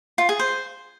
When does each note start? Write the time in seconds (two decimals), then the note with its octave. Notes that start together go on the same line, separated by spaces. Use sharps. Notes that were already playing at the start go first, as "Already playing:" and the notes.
0.18 F4
0.29 G#4
0.39 C5